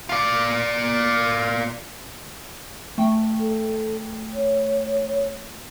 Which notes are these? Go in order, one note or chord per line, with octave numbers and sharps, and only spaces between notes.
F4 D5
A3 G5
A4
C#5